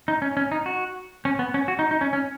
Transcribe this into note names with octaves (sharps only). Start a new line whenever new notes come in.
D#4
C#4
C#4
D#4
F#4
C#4
B3
C#4
F#4
D#4
D#4
C#4
C#4